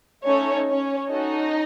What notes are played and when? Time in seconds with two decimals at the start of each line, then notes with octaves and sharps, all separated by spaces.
0.25 A3 C#4 D#4 A4 C#5
0.69 C#4 C#5
1.11 C#4 D#4 F#4 A4 D#5